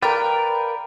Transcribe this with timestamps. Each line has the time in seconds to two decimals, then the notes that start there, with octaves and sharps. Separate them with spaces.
0.02 A#4 B4 D5 F5 G5